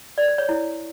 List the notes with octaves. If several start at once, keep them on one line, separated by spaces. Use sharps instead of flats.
D5
C5
C#5
E4